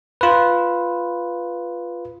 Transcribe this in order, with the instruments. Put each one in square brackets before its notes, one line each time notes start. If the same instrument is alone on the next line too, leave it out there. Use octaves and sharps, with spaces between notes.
[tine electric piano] F4 B4